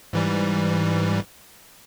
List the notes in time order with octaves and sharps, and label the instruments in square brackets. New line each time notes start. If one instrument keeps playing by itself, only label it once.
[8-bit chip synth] G#2 E3 G3